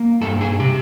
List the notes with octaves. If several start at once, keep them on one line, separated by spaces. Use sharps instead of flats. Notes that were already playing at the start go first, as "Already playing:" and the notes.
Already playing: A#3
G2 A4
G#4
C3 G4